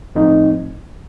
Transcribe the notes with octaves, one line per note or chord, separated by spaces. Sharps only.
A2 F3 A3 C4 D#4